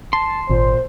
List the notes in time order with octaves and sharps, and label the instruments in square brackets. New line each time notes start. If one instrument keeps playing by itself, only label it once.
[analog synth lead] A5 [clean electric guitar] C6
[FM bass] G#1 [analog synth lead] A#2 [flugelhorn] C5